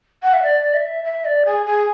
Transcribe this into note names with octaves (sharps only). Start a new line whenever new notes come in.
F#5
E5
D5
E5
E5
D5
G#4
G#4